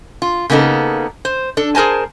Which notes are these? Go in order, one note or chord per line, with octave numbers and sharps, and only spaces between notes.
F4
C#3 A#3 B3 D#4 A4
C5
D4 A4
G#4 A#4 C5 G#5 A5